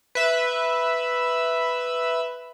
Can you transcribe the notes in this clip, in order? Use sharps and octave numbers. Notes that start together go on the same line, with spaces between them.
B4 E5